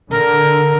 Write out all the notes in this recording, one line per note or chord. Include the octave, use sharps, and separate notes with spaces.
D3 A#4